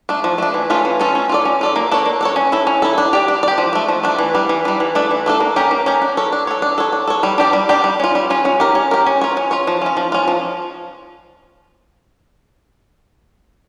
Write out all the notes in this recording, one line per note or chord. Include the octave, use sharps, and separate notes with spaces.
A3 D4
F3
A3 D4
E3
A3 C#4 F4 A4
E3
A3 C#4 F4 A4
C#4
F4 A4 D5
C#4
F4 A4 D5
A#3
D4 A4 C#5
A#3
D4 A4 C#5
C#4
E4 A4
C#4
E4 A4
D4
G4 D5
D4
G4 D5
F3
A3 D4
F3
A3 D4
E3
G3 D4
E3
G3 D4
E3
A3 D4 A4
E3
A3 D4 A4
A#3
C#4 G4 A#4
A#3
C#4 G4 A#4
D4
A4 C#5
D4
A4 C#5
D4
A4 C#5
D4
A4 C#5
G3
D4 G4 D5
G3
D4 G4 D5
G3
C#4 F4
G3
C#4 F4
C#4
G4 A#4
C#4
G4 A#4
C#4
F4 C#5
C#4
F4 C#5
F3
C#4 F4
F3
C#4 F4
F3